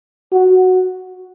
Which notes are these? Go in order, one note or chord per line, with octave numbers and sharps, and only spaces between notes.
F#4